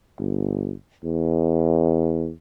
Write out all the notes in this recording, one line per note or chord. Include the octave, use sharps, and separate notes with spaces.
G1
E2